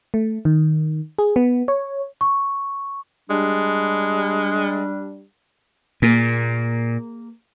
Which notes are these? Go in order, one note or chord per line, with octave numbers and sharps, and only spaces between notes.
A3
D#3
G#4
B3
C#5
C#6
G3 G#3 D4
A#2 A#3 G#4 A#4